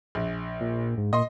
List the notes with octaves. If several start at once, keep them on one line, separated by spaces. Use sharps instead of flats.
A#1
A#2
G#2
A#2 D#5 C6